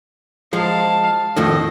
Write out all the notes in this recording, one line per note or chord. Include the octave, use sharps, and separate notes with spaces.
F3 G#3 F5 A5
F2 A2 D#3 D#5